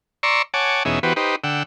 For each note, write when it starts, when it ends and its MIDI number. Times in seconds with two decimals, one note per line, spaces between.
0.23 0.42 74
0.23 0.42 82
0.23 0.42 84
0.23 0.42 85
0.23 0.42 88
0.54 0.83 73
0.54 0.83 78
0.54 0.83 80
0.54 0.83 81
0.54 0.83 86
0.85 0.99 40
0.85 0.99 47
0.85 0.99 61
0.85 0.99 63
0.85 0.99 68
0.85 0.99 76
1.03 1.13 52
1.03 1.13 59
1.03 1.13 66
1.03 1.13 67
1.03 1.13 71
1.03 1.13 72
1.16 1.36 63
1.16 1.36 67
1.16 1.36 71
1.16 1.36 72
1.44 1.63 50
1.44 1.63 78
1.44 1.63 79
1.44 1.63 88